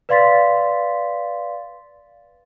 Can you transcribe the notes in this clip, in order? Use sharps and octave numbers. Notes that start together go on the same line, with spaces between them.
B4 D5 F5 C6 A6 B6